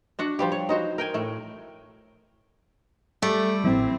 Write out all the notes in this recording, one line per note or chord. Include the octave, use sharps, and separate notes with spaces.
D4 F#4 F#5
F3 G3 G4
C#5
D#4 F#4 C5
A#4 G5 G#5
A2 A3
G3 A3
A1 F3 C4 E4